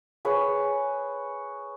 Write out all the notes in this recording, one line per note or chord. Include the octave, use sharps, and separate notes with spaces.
G#4 B4 C#5